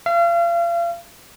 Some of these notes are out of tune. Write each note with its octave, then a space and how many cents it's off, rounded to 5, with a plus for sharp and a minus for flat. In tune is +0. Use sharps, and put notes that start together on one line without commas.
F5 -35